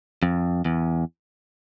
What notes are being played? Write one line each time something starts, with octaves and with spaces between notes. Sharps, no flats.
F2
E2